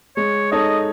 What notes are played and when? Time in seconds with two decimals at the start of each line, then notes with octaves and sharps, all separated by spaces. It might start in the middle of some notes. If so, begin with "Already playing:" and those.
0.17 G#3 C#5
0.52 D#4 A4 C#5 D#5